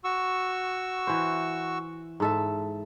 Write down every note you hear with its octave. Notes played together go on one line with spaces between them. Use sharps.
F#4 C#6 E6
E3 C5
G#2 A4 E5